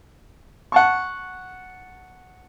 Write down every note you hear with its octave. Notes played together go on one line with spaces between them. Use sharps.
F#5 A5 C#6